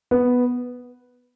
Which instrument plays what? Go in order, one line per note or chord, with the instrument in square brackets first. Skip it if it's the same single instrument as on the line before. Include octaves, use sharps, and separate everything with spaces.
[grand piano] B3